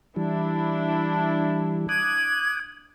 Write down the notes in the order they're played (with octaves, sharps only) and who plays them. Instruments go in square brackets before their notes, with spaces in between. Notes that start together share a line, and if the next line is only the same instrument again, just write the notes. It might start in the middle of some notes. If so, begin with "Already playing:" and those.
[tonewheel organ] E3 G3 [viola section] D4 E4
[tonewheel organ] D6 D#6 F#6 [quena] G#6